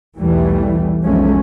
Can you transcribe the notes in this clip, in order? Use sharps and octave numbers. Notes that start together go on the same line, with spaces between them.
B1 E2 E3 G3 A3
B1 F2 F#3 G#3 A3 C#4